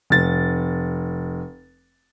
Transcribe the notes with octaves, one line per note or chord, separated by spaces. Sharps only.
F1 A6